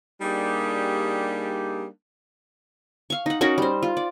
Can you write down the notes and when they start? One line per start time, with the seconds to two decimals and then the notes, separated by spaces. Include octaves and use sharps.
0.21 G3 A#3 D4 D#4 G4 G#4
3.10 F5 C#6
3.26 D#4 F#5
3.41 C#4 D#4 F#4 A#4
3.58 G3 C5
3.83 F4
3.97 D5